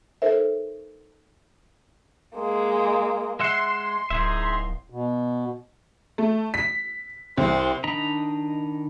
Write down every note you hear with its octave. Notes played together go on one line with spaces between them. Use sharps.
D#4 A4 A#4 C5 E5
G#3 A#3
G#3 E5 F#5 C6
D1 D#4 G#4 E5
B2
A3
B6
C2 C5
D#3 D4 D#5 A#5 B5